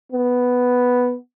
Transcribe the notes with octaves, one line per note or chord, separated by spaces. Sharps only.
B3